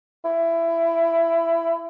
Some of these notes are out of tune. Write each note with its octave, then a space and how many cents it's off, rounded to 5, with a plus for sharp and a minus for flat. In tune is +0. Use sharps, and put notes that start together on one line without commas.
E4 +20